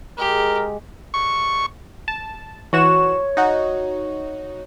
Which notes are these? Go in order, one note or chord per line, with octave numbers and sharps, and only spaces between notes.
G#3 G4 A#4
C#6
A5
E3 F#4 C#5 E7
D#4 F#4